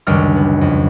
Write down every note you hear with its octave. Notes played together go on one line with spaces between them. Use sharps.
C#2 F#2 D#3 G3 D4 F6
B3
F2